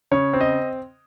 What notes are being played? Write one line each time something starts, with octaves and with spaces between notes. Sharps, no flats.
C#3 C#5
C4
D#5